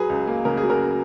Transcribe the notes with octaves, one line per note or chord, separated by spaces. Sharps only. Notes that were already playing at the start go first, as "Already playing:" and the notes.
Already playing: F#3 G#4 B4
C#2
A#3
C#3 A#4
F#3 G#4
F#4 A#4